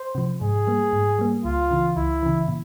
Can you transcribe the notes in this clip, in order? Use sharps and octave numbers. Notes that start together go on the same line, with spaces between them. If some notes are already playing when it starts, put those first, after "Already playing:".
Already playing: C5
C3 F3
G#2 G#4
G3 A#3
G#2
G3 A#3
C#2 F4
C#3 E3
C#2 E4
C#3 E3
A#2